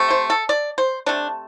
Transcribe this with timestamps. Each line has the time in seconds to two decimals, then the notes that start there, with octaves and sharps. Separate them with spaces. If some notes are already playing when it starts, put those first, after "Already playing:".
Already playing: C3 A3
0.10 C5
0.30 A4
0.49 D5
0.78 C5
1.06 C3 A3 D4